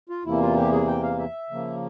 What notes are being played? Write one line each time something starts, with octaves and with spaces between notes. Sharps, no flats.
F4
E2 C3 E3 A#3 E4
F4
G4
G#4
G5
F5
E5
C#3 F3 A#3